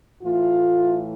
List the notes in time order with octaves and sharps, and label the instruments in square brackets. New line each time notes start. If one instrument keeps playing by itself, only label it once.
[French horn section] A2 E3 A3 F4